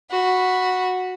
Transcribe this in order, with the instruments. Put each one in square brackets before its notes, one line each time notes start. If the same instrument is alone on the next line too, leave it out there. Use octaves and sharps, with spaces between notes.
[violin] F#4 B5